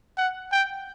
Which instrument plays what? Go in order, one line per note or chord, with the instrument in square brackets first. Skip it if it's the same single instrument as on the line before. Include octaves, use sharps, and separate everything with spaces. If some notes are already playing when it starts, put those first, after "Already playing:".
[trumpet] F#5
G5